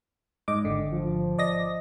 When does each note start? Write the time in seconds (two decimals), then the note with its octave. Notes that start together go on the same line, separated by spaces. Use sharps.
0.48 G#2 D#5 D6
0.65 G#1 D3
0.92 F3
1.39 D5 D#5 A#6